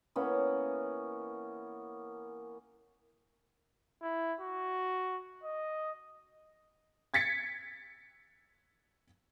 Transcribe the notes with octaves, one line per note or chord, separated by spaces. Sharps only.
E3 A#3 B3 C#4
E4
F#4
D#5
G#6 A6 B6 C#7